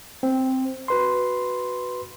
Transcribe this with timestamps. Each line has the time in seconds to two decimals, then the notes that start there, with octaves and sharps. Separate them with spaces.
0.23 C4
0.88 F#4 B4 C6